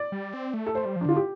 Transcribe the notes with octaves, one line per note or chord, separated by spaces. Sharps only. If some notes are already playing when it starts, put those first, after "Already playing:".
Already playing: D5
G3
C4
A3
A4
A3 C5
G3
F3 D4
D3 F4
G4